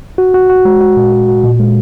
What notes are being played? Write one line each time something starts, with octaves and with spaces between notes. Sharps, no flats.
F#4
F#4
F#4
G#3
F#4
A#2
F#4
F#4
A#2
G#3